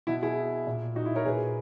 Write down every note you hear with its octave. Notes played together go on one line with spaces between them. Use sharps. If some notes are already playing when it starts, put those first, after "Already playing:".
B2 E4
E4 G#4
A#2
D#4 F#4
E4
A#4 C#5
A#2 G#4 B4